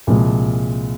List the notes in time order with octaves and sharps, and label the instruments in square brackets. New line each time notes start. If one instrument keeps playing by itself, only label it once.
[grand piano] C2 A#2 F3 G#3